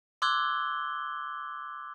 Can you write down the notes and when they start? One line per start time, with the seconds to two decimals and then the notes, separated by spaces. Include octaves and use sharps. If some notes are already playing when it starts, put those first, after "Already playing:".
0.22 C6 D6 E6 F#6 G#6 G7